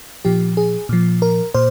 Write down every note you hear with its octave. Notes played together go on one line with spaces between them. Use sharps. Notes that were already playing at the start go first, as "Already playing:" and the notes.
A#2 F3 G4
G#4
A#2 F3
A#4
A#2 C5